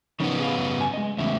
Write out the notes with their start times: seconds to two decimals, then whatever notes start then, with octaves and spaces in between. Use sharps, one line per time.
0.20 C#3 F3 B3 D#4 A#4
0.39 G#4 F5
0.56 F#2
0.77 G2 G#5
0.93 G#3 D#5
1.18 E2 C#3 F#3 A3 E5